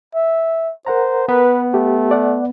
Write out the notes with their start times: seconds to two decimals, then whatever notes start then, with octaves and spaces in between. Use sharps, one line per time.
0.15 E5
0.87 A#4 C5 F#5 A#5
1.28 B3 B4
1.74 A3 G4
2.11 D5 F#5